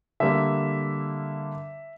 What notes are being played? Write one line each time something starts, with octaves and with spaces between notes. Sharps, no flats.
D3 G3 A#3 E5